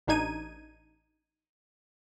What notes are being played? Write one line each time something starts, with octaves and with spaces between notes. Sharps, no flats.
A1 D4 D#4 G#6 D#7